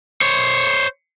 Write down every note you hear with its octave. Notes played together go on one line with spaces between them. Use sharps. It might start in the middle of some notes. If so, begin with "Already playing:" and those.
C5 C#5